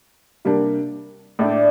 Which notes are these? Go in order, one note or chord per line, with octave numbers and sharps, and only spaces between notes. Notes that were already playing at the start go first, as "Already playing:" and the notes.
C3 G3 A#3 D4
A2 A3 D4 D5